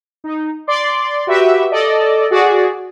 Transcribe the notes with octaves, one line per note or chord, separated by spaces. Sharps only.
D#4
D5 C6 D6
F#4 G4 B4 E5
A4 D5 D#5
F#4 G#4 D5